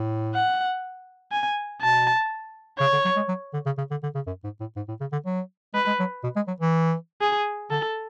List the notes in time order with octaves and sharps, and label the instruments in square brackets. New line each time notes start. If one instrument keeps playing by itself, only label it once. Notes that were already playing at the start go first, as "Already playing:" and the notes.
Already playing: [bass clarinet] A2
[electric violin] F#5
G#5
[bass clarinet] B2 [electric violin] A5
[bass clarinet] C#3 [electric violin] C#5
[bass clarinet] D3
F#3
G#3
F#3
D3
C#3
C#3
D3
D3
C#3
F#2
G#2
A2
G#2
A2
C#3
D3
F#3
[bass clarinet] G#3 [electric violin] B4
[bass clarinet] G#3
F#3
B2
G#3
F#3
E3
[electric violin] G#4
[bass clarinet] D3 [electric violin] A4